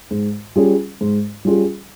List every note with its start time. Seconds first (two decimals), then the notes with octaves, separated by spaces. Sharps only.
0.11 G#2
0.56 G3 C#4 F4 G#4
1.01 G#2
1.45 G3 C#4 F4 G#4